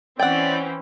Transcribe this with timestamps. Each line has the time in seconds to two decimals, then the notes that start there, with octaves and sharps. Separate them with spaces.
0.19 E3 C4 C#4 D5 F#5 G5